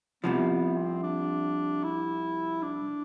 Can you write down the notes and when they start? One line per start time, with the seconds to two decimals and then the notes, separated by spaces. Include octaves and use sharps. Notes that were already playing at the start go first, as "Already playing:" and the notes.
0.24 C2 C3 F3 B3
0.50 B3
0.77 C4
1.03 D4
1.84 E4
2.62 D4